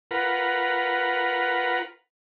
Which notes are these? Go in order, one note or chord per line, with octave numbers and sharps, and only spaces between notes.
F4 A#4 B4 F#5